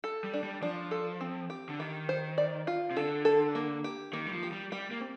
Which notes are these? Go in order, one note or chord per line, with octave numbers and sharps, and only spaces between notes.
A4
G3
D4
G3
F3 D4
A4
C4
G4
D3
D#3 G4
C5
D5
F4
C3
D3 A4
A4
A#3
G4
D#3 A#3
G3
F3
G4
G3
G3 G4
A#3
C4